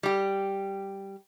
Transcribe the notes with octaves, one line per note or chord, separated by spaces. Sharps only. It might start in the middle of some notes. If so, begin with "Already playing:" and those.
G3 G4